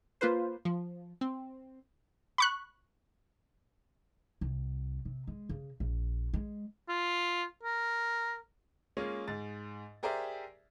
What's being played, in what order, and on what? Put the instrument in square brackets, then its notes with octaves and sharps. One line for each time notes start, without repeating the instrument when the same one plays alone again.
[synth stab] A#3 F4 B4 C5
F3
C4
[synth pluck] B5 C#6 F#6
[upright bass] C2
C3
G#3
C#3
A#1
G#3
[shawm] F4
A#4
[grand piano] G#3 A#3 C#4 F4 G#4
G#2 A6
G4 G#4 A#4 C5 D5 E5